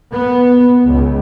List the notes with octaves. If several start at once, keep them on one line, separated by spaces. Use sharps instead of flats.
B3
C#2